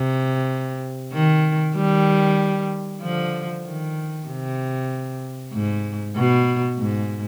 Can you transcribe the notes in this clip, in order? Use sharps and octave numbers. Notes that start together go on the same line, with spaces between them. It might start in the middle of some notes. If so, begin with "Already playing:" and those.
Already playing: C3
D#3
D#3 G3
D3 F3
D#3
C3
G#2
B2
G#2